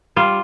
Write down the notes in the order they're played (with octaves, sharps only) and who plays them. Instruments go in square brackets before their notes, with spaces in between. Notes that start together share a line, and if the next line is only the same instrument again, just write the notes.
[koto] G3 F4